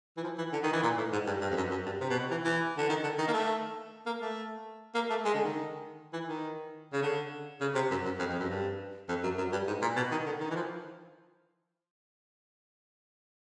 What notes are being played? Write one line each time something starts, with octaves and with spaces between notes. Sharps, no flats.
E3
F3
E3
D3
D#3
E3
A#2
A2
G#2
G2
G2
F2
F#2
F#2
G2
C3
B2
C3
E3
E3
D3
D#3
D3
D#3
A#3
A3
A#3
A3
A#3
A3
G#3
D3
D#3
E3
D#3
C#3
D3
C#3
C3
F#2
F#2
F2
F2
F#2
G2
F2
F#2
F#2
G2
G#2
A#2
B2
D#3
D3
D#3
E3
F3